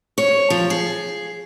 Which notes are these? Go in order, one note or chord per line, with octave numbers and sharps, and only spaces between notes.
C#5
F3
G#4